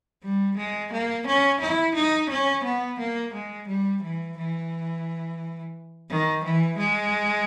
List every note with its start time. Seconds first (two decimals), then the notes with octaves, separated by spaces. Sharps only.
0.23 G3
0.57 G#3
0.92 A#3
1.27 C#4
1.60 E4
1.95 D#4
2.30 C#4
2.64 B3
2.99 A#3
3.34 G#3
3.68 G3
4.02 E3
4.37 E3
6.09 D#3
6.44 E3
6.78 G#3